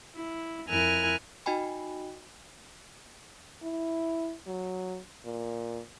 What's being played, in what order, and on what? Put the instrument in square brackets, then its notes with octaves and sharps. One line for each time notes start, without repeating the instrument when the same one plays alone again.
[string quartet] E4
F2 E4 A#4 G#5 F6 F#6
[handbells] D#4 F#4 D#5 G5 G#5 B5
[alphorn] E4
F#3
A#2